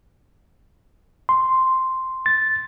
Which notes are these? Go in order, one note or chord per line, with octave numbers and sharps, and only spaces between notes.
C6
A6